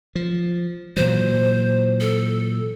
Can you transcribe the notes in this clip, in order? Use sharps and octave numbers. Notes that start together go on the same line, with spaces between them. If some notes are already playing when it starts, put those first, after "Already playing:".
F3
A#2 E3 F#3 C5
A4